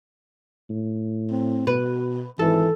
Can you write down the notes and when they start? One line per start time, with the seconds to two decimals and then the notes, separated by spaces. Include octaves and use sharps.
0.70 A2
1.31 C4
1.67 B2 B4
2.39 G#1 E3 A4